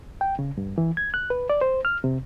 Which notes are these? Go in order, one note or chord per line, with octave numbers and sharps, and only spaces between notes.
G5
C#3
G2
E3
G#6
F#6
B4
D5
C5
F6
C3